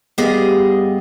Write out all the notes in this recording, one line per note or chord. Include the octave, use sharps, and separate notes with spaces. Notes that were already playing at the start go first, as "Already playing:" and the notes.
G2 B3 G4 G#4 D#5 F5